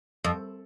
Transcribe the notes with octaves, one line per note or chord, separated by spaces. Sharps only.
F2